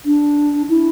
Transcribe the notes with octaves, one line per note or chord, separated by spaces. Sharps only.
D4
E4